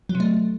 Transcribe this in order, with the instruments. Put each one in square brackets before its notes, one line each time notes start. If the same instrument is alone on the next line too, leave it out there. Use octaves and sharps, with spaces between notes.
[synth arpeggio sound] F#3
C3
A3